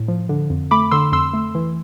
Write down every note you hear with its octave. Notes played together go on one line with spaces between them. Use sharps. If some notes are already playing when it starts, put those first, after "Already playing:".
Already playing: A2
F3
D3
F2
A3 B5 D6
D3 C6 E6
F2 C6 E6
A3
E3